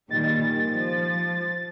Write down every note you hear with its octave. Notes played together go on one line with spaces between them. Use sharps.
A#2 D#3 G3 A6
F3